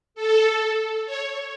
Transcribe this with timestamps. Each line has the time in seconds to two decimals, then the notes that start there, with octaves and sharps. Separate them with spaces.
0.15 A4
1.06 C#5